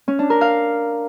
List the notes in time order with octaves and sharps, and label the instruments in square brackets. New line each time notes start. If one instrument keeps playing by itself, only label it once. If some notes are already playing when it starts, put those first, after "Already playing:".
[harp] C#4
D4
A#4
F5